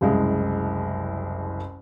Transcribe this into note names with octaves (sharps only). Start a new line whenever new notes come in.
F#1 C2 G#3